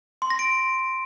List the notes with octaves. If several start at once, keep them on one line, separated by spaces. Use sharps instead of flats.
C6
A#6
D7